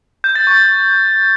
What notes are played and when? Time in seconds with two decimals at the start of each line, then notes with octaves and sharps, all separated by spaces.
0.24 G6
0.35 A6
0.47 C#6